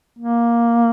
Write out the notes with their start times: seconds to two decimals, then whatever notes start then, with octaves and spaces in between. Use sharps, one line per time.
0.19 A#3